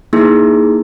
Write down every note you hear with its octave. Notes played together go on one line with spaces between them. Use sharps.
A#3 D#4 E4 G#4